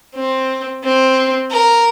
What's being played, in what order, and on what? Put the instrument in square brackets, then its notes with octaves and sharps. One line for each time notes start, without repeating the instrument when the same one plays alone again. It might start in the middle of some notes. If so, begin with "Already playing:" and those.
[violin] C4
C4
A#4